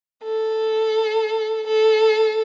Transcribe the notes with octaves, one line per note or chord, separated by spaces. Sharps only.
A4
A4